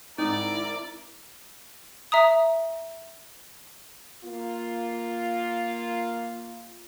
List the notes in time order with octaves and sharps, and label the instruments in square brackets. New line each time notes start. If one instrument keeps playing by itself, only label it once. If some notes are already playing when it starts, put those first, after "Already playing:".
[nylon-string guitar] G#2 C4 [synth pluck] D#4 [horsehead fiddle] E4 A#4 [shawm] D5
[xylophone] E5 A#5 D#6
[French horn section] A#3 F4